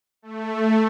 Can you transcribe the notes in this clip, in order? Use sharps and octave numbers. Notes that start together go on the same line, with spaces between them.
A3